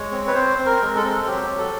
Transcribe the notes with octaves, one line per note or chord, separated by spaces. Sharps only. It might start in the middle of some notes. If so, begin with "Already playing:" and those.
Already playing: G#3 C#5
C4
B4
C4 C5
C4
A#4
G#3
A4
C4
F#3 G4
F#3
A4